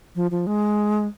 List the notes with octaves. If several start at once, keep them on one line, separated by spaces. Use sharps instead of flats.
F3
F3
G#3